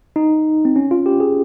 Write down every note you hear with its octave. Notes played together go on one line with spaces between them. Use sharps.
D#4
C4
C#4
F4
G4
G#4